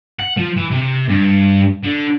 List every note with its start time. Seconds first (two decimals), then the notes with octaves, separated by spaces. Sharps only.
0.19 F#5
0.37 F3
0.57 E3
0.71 C3
1.09 G2
1.83 D3